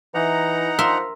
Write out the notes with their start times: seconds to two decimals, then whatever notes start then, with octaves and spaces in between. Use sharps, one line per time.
0.15 E3 D#4 F#5 A#5
0.79 F3 A#4 E5 C6